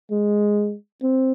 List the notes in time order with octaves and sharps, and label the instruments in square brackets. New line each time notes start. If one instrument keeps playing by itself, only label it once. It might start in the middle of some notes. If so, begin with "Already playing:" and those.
[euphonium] G#3
C4